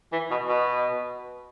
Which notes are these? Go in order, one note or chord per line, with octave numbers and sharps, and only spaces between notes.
E3
B2
B2